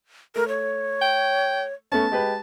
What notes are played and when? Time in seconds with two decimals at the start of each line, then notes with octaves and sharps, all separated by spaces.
0.36 A3 A#4
0.48 C#5
1.01 G5
1.92 A3 B3 C#4 A5
2.11 G#3 G4 B4